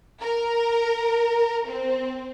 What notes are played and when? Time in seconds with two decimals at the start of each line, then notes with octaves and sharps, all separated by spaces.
0.21 A#4
1.68 C4